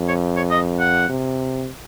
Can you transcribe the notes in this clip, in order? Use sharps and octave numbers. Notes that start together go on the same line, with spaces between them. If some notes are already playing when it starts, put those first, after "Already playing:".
Already playing: F2
C#5
C#5
D#5
F#5
C3